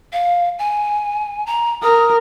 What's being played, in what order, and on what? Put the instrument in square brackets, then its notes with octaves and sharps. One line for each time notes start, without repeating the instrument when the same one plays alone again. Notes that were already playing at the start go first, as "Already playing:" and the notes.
[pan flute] F5
G#5
A#5
[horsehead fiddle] A#4 [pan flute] D#6